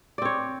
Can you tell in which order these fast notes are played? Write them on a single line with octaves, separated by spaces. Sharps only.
D5 C4 C#5